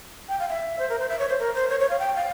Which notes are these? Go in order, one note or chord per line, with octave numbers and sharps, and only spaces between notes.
G5
F5
E5
C5
A#4
C5
E5
C#5
C5
A#4
C5
C#5
C#5
F5
G5
F5